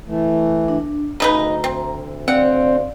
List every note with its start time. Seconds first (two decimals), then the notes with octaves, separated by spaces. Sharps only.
0.07 E3 A3
0.68 D4
1.20 D2 C#3 D#4 B4 A#5
1.64 C4
2.28 C4 D5 F5 F#5